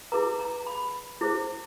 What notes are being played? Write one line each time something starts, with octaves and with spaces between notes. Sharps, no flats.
E4 G#4 B4 A#5
A#5
B5
E4 G#4 C5